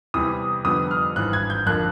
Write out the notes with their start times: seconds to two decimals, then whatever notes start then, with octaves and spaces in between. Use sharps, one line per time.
0.14 E2 C3 E3 G3 D#6
0.65 F2 D3 G3 B3 D#6
0.91 F6
1.16 G#1 G2 E3 F#6
1.33 G#6
1.50 G6
1.66 F2 D3 F3 A#3 F#6